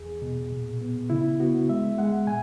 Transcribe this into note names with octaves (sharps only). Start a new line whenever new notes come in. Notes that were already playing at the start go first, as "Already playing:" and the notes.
Already playing: E2 G#4
B2
A#2
B3
C#3 E4
B3 F#4
G#3 E5
G#3 F#5
A#2 G#5